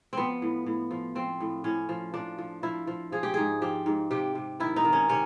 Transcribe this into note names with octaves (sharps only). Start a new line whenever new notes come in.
F3 B3 C4
A2
A2
F3
F3 C4
A2
A2 C#4
F3
F3 D4
F3
F3 E4
F3
F3 G#4
G4
G#2 G#4
F3 G4
G#2
C3 G4
C3
D#3 E4
D#4
D#3
C#4
C3 C#4